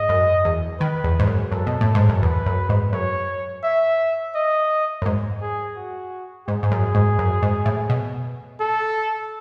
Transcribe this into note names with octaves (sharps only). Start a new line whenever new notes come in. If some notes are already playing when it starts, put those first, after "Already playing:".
Already playing: G#2 D#5
F#2
E2
D#3 B4
E2
G#2
F#2
F#2 A4
B2
A2
G#2
F#2
E2 B4
F#2
G#2
F#2 C#5
E5
D#5
F#2
G#2
G#4
F#4
G#2 G#4
G#2
F#2
G#2
F#2
G#2
A2
B2
A4